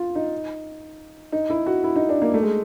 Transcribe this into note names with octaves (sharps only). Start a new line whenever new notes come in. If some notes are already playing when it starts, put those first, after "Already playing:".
Already playing: F4
D#4
D#4
E4
F#4
E4
D#4
D4
A#3
A3
G#3